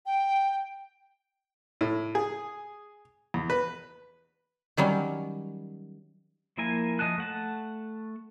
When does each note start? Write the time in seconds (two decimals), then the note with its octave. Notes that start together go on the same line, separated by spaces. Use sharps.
0.06 G5
1.81 A2
2.15 G#4
3.34 E2
3.50 B4
4.77 D#3 F#3 G3 C#4
6.58 F3 A#3 E4 A#4 G#5
6.99 F3 D#5 G#5 A5 F#6
7.18 A3 F#5 A5